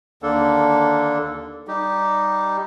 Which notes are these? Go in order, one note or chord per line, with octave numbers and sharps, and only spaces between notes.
D#2 D3 A#3 D4 A4
G3 D#4 G4